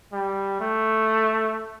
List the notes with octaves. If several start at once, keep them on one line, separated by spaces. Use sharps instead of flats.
G3
A3